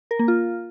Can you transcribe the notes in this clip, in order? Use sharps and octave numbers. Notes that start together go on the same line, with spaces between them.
A#4
A#3
F4